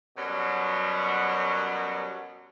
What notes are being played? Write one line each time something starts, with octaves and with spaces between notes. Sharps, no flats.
F#2 B2 F#3 G3